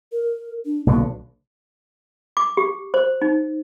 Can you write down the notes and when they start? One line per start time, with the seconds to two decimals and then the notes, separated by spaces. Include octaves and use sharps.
0.12 A#4
0.66 D4
0.87 B1 B2 D3 A#3
2.37 D6
2.57 G4
2.94 C5
3.22 D#4